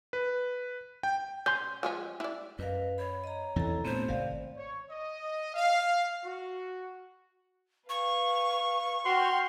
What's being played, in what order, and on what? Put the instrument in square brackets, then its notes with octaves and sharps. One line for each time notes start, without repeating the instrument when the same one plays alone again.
[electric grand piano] B4
G5
[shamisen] C#4 [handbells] C6 G6
[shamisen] F3 G#3 C#4
E4 D5
[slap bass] F#2 [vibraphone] B4 F5 [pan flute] D#5
[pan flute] C#5 [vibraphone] B5
[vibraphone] D#5 A#5
[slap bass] E2 E3 C4 [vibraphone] E4 A4 A#5
[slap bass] G2 A#2 [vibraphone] A3 B3 C4 [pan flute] C5
[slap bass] G#1 C3 [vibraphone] D5 F5
[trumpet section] C#5
D#5
F5
F#4
[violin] B4 F5 [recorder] C#6
[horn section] F#4 [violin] G5 F6 [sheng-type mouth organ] C6